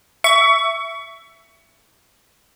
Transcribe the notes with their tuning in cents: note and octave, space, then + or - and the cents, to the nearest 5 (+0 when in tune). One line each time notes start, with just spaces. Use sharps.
E5 +10 C#6 +20